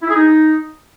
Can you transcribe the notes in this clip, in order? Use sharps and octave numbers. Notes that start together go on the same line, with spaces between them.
E4
G#4
D#4